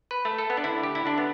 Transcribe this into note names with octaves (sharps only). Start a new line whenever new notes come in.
B4
A3
A4
B3
D4
D3 E4
G4
E4
D3 D4
B3